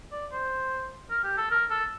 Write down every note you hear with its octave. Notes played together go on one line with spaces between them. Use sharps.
D5
C5
A#4
G4
A4
A#4
A4